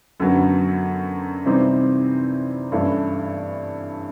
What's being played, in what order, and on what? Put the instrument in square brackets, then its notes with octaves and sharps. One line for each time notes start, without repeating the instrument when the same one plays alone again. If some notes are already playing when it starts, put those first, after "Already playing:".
[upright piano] F#2 D3 F#3 B3
C3 E3 G3 C4 D#4
G2 E3 A3 C#4 E4